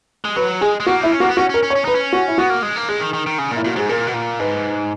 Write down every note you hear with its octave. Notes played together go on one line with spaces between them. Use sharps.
G#3
F#3 B4
G#3 G#4
G#3
A#3 F#4
D#4 E4
C#4
A#3 F#4
B3
C#4 F#4
C#4
A#4
C#4
C#5
C#4
D#4 B4
C#4
F#4
E4
B3 F#4
A#3
G#3
A#3
G#3 G#4
D#3
D#3
D#3
C#3
A#2
E4
A#2 F#4
G#2 G#4
A#2 A#4
B2
A#2
G#2 B4